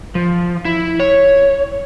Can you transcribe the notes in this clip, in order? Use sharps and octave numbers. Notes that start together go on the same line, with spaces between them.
F3
E4
C#5